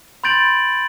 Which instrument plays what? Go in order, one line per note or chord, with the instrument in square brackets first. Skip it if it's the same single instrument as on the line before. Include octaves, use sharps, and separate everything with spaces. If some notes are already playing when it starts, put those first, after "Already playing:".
[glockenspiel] B5 C6 G6 A6 D7 F#7